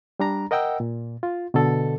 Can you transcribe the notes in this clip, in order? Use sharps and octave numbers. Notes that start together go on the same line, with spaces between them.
G3 D4 A#5
A#4 D#5 F#5 G5 E6
A#2
F4
B2 D3 A4